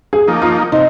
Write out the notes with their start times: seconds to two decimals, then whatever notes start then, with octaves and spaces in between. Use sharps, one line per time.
0.13 G#4
0.27 F3 A#3 D#4
0.42 F4
0.72 C3 D#4